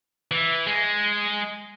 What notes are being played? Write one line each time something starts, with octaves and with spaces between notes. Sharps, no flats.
E3
G#3